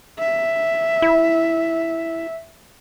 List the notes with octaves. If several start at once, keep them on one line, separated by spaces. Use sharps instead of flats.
E5
E4